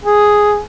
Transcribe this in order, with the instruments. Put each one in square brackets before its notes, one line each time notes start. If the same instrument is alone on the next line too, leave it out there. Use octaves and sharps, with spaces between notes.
[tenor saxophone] G#4